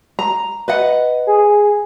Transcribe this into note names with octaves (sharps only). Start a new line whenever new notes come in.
A#5
B4 D#5 F#5
G#4